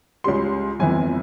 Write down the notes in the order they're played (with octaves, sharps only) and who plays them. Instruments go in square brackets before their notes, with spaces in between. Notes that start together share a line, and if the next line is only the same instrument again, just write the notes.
[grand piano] C#2 C#3 G3 C6
G1 F2 E3 G#5